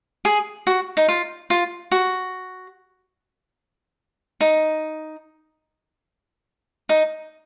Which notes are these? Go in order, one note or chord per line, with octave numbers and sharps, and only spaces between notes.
G#4
F#4
D#4
F4
F4
F#4
D#4
D#4